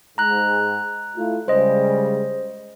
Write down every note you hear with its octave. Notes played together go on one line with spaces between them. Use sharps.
G#2 A#5 F#6
A3 E4 F4
C#3 G3 G#3 C5 D#5